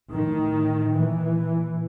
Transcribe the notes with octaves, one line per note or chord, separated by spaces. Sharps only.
A2 D#3
A#2 E3